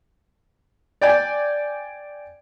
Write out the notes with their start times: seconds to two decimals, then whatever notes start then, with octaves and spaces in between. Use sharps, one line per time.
1.01 D5 G5 G#5